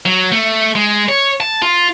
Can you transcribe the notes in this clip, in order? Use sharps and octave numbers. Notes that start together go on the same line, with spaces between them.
F#3
A3
G#3
C#5
A5
F4